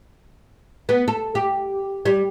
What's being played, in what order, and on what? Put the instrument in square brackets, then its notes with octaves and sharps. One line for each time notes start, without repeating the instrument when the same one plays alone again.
[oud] B3
A4
G4
G3